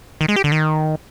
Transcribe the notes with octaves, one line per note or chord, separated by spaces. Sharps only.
D#3
G#3
G4
D3
D#3